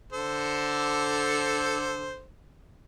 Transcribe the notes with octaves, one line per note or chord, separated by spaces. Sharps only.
D3 A4 C5